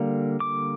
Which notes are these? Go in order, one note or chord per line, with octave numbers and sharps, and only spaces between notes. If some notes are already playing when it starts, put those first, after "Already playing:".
Already playing: D3 G3 A#3
D6